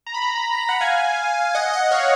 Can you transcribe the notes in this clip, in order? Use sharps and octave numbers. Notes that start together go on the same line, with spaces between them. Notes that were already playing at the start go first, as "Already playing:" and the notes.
A#5
B5
A#5
B5
A#5
B5
A#5
B5
F#5 A#5
F5 G#5
D#5 F#5
D#5 F#5
C#5 F5